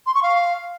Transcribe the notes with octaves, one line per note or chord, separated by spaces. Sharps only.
C6
C#6
F5